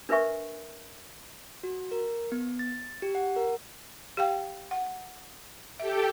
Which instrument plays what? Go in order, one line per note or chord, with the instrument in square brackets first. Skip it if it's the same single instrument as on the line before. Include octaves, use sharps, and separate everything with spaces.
[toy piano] D4 A#4 B4 E5 G#5 C#6
[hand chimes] F#4
A#4
B3
A6
G4
F#5
A#4
[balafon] G4 F5 G5
F#5
[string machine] G4 A4 G5 [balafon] E5